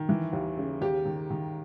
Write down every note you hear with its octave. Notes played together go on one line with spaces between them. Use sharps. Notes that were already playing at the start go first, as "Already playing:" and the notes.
Already playing: D#3
E3
D#2
C#3
D#2 G4
D#3
D#3